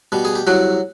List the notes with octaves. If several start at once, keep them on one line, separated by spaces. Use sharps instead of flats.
B2 G3
G#4
G4
C2 F#3 F#4